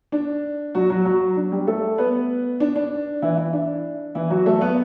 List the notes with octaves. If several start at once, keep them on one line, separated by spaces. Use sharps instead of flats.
D4
F#3 F#4
F#3 F#4
F#3 F#4
D4
G3 G4
A3 A4
B3 B4
D4
D4
E3 E4
E3 E4
D4
E3 E4
F#3 F#4
A3 A4
B3 B4